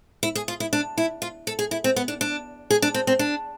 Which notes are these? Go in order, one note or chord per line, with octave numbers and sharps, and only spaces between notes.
E4
G#4
F4
E4
D4
E4
F4
A4
G#4
E4
C4
B3
D4
D4
G#4
D4
C4
C4
D4